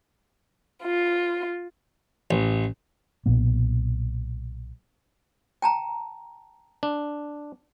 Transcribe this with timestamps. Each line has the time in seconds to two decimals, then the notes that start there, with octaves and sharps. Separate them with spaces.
0.83 F4
2.31 A1
3.26 B1 A#2 A#3 B3
5.62 G5 A5 A#5
6.83 D4